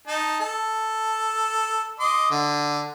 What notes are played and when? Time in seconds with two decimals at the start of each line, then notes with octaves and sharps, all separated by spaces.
0.07 D#4 A5
0.40 A4
2.00 D#5 C6 D6
2.31 D3